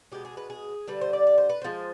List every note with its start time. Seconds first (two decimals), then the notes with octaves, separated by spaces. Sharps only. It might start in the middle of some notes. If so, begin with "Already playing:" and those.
0.12 B2 G#3 G4
0.25 G#4
0.37 B4
0.50 G#4
0.88 D3 G3 B4
1.01 C5
1.13 D5
1.27 D5
1.38 C5
1.49 B4
1.62 C3 F3 G#3 C5